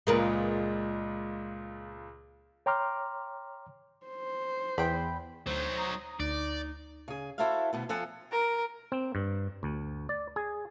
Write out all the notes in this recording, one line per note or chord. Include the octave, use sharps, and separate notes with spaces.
C#2 A#2 G#3 A#4 B4
C#5 G5 A#5 C6 D6 F6
C5
E2 G5 B5
D2 F#3 D#4 C5
A#5 D#6
D2 D#4 D5
C#3 G#4
E4 F#4 A4 C5 E5 F5
D2 B2 B3
F2 F3 A4 F#5 G#5
A#4
C4
G2
D2
D5
G#4